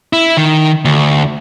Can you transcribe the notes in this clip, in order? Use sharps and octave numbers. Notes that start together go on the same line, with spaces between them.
E4
D#3
D2